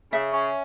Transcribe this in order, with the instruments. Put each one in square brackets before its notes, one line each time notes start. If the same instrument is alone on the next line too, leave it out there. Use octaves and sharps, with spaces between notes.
[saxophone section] C#3 [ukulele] E5
[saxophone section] C#4